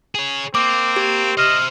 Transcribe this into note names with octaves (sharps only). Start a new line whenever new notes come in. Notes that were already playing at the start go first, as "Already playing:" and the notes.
G#4 C#5
A#3 C4 D6
G4
C5 D#5 E5 F6